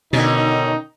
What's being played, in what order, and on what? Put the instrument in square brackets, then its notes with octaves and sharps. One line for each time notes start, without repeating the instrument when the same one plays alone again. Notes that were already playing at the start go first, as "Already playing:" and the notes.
[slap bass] B2 [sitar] D3 C#4 [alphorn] D#3 [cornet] D#4